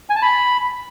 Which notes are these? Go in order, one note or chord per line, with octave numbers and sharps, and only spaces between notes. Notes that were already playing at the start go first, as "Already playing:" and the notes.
G#5
A5
B5